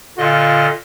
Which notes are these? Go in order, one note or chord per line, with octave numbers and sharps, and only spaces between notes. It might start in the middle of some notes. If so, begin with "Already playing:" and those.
A#2 D3 F4 D#5